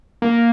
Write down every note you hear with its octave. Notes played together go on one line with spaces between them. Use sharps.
A#3